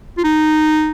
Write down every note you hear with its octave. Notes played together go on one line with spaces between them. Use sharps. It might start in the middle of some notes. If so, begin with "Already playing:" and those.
F4
D#4